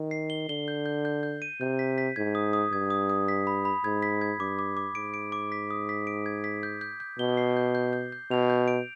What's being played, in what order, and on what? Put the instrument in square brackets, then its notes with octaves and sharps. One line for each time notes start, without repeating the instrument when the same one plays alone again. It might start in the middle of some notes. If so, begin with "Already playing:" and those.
Already playing: [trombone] D#3
[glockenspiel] C7
G7
[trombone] D3 [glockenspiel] G7
[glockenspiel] G6
G6
G6
G6
D#7
[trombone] C3 [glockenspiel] G6
[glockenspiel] B6
B6
[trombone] G#2 [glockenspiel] G#6
[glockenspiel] D#6
D#6
[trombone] G2 [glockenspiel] G#6
[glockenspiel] D#6
D#6
B6
B5
B5
[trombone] G#2 [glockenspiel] G#6
[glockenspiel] B6
G#6
[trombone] G2 [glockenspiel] D6
[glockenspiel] D6
D6
[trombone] G#2 [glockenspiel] D7
[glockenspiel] D7
D6
B6
D#6
B6
D7
G#6
B6
G6
G6
G6
[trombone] B2 [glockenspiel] G7
[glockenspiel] C7
G6
G6
G6
G6
[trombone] B2 [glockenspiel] F7
[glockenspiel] G6
D7